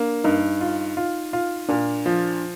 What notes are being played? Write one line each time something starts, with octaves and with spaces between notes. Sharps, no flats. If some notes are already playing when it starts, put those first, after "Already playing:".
Already playing: A#3 D4
G2 D#4
F4
F4
F4
A#2 D4
F3